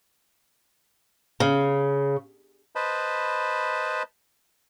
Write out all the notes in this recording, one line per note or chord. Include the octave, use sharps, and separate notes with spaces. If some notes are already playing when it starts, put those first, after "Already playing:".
C#3
B4 C5 D#5 A5 B5